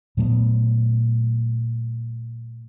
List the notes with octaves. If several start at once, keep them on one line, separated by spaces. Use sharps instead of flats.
A#2 F#3 A3 B3